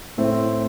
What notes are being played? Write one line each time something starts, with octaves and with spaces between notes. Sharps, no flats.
A2 A3 C4